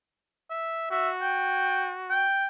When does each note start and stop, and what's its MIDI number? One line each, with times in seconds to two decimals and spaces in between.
0.50 0.91 76
0.91 2.27 66
0.91 1.09 76
1.21 1.91 79
2.10 2.47 79